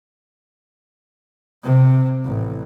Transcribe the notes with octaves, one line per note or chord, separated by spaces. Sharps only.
C3
A1